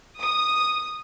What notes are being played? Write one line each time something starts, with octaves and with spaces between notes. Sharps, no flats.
D#6